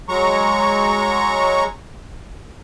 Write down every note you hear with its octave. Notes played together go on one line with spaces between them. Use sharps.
F#3 G#3 A#5 C#6